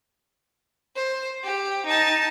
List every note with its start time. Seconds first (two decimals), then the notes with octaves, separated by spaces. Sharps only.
0.96 C5
1.44 G4
1.86 D#4 A5